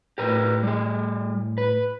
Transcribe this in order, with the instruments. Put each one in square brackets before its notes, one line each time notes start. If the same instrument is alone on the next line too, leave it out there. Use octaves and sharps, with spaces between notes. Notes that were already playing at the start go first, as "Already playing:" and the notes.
[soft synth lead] A2 [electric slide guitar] G4 A#4 B4
[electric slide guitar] G3 G#4
B4